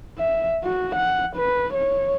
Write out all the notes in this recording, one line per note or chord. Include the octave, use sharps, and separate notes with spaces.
E5
F#4
F#5
B4
C#5